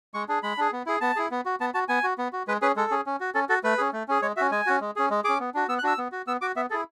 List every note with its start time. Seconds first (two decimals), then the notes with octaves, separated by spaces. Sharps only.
0.14 G#3 C#6
0.29 D4 G#4
0.43 G#3 B5
0.58 D4 G#4
0.73 B3
0.86 E4 G#4
1.01 B3 A5
1.16 E4 G#4
1.31 B3
1.46 F#4
1.60 B3 A5
1.74 F#4 A5
1.88 B3 G#5
2.04 F#4
2.18 B3
2.33 F#4
2.47 G#3 B4
2.62 C#4 G#4 B4
2.76 G#3 A4
2.91 C#4 G#4
3.06 C#4
3.20 F#4
3.35 C#4 A4
3.49 F#4 A4
3.64 A3 B4
3.78 C#4 G#4
3.93 A3
4.08 C#4 G#4
4.22 G#3 C#5
4.36 C#4 F#4 E5
4.51 G#3 G#5
4.66 C#4 F#4
4.81 G#3
4.96 C#4 G#4
5.10 G#3
5.24 C#4 G#4 D6
5.40 B3
5.54 D4 F#4
5.68 B3 E6
5.79 F#6
5.83 D4 F#4 E6
5.98 B3
6.12 F#4
6.27 B3 E6
6.41 F#4 D6
6.56 B3 E5
6.70 E4 G#4 A4